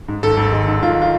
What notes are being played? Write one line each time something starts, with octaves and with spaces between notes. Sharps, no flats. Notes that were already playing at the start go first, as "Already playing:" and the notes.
G#2
G#1 A4
G#1
G#3
G#2
G#1 F4
F4